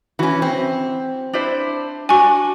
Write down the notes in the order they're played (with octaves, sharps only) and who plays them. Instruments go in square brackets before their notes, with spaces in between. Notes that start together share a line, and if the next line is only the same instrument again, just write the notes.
[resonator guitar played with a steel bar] E3 C#4 [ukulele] F#4
[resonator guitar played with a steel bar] C4
[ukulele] D4 E4 C5
[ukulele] D4 F#4 [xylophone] G#5 C#6